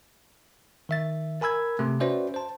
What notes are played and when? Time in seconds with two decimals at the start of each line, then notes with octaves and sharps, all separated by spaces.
0.89 D#3 E5 A6
1.41 A#4 G#5 B5 E6 G#6
1.79 C3 A3
2.00 C#4 F#4 B4 C5 D5 E5
2.34 C5 A5